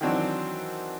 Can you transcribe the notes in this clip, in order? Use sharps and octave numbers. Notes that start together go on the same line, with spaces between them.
D#3 E3 F#3 C4 D4 F#4